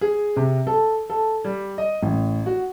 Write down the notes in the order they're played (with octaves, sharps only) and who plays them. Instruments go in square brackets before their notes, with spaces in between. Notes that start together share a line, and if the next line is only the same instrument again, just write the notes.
[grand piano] G#4
C3
A4
A4
G3
D#5
A1
F#4